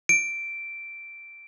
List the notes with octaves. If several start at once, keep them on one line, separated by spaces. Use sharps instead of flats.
D7